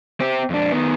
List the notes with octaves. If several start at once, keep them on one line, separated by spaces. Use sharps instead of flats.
C4 G4
F2 D4
D#3 B3